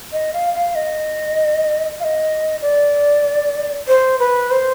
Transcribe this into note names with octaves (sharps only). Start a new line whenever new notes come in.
D#5
F5
F5
D#5
F5
D#5
D5
C5
B4
C5